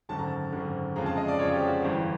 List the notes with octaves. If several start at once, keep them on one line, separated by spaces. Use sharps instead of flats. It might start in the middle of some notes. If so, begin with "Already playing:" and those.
G#1 F#2 D3 A5
A#5
A5
G#1 F#2 D3
F2 C#3 F3 G#3 A#5
A5
D#5
D5
F2 C#3 F3 G#3 C#5
G4
F#4
G1 G2 E3 G4